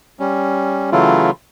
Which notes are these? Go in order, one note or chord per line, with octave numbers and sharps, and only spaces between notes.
G3 C#4
C#3 E3 F#3 A3 E4 F4